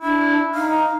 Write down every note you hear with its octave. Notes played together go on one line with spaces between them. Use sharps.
D4 E4
D#4 F5